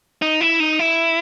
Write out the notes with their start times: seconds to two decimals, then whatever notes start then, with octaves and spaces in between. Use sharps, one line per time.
0.22 D#4
0.41 E4
0.60 D#4
0.79 E4